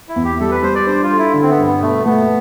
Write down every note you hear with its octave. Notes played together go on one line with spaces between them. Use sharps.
E4
E2
G4
G3 A4
B4
G3 C5
D5
D4 C5
F4
A4
E4
D3
C4
B3
G2
B3
B2 A3
A3 B3